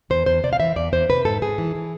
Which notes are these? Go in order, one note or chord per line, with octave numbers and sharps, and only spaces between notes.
E2 C5
E2 C5
C3 D5
F5
E3 E5
E2 D5
E2 C5
C3 B4
G#2 A4
G#2 G#4
E3
E3